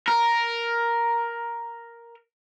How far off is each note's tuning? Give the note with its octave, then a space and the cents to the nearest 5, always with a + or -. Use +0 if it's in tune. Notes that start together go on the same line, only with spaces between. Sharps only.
A#4 +5